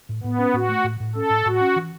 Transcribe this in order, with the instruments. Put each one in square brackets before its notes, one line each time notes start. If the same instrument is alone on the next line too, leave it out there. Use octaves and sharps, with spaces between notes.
[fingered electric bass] A2
[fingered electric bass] A2 [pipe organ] B3
[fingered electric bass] C#4
[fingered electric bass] A2 [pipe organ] F#4
[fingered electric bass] A3
A2
A2
[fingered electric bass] C#4 [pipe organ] A4
[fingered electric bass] A2
[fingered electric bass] A2 [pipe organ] F#4
[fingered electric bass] C#4
E3